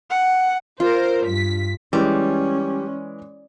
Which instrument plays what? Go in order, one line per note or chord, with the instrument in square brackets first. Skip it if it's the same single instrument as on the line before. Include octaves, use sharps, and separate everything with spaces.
[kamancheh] F#5
[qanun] F4 [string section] A#4 C5
[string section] G2 B6
[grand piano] E3 G#3 [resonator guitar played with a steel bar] G3 [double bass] C#4